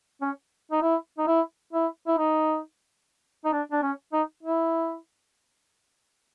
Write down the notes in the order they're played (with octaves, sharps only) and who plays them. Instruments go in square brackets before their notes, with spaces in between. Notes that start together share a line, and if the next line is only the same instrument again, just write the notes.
[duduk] C#4
D#4
E4
D#4
E4
E4
E4
D#4
D#4
D4
D4
C#4
D#4
E4